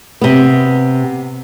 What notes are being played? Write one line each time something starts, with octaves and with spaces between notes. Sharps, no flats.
C3 B3